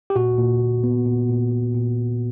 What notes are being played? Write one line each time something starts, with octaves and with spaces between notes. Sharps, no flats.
G4
A#2 F#4
A#2
A#2
B3
A#2
A#2
A#2
A#2